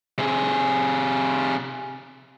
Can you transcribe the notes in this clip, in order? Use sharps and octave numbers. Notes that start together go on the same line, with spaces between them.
C3 G#4